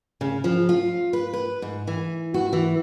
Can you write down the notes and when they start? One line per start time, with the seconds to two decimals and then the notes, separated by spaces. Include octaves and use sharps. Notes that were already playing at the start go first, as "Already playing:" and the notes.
0.21 C#3
0.44 F3
0.69 F4
1.13 B4
1.33 B4
1.62 G#2
1.87 E3
2.34 F#4
2.53 E3